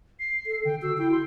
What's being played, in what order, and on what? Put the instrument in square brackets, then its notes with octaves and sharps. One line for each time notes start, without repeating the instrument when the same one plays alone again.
[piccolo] C7
[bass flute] A4
[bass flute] D3 [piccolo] G5
[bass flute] F#4 [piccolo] E6
[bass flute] E4 [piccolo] G5
[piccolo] C6